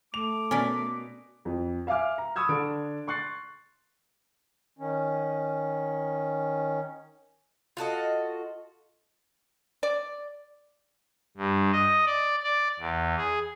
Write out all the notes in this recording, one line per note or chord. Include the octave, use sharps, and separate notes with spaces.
A3 D6 F7
B2 C#4 A#4 D5 B6
F2
E5 F5 G#5 D6 F6
A#5
B5 C#6 D#6 E6 G#6
D3 D4 A4 D7
C6 C#6 F#6 A6 C7
D#3 C#4
F4 F#4 A4 D#5
D5
G2
D#5
D5
D5
E2
G#4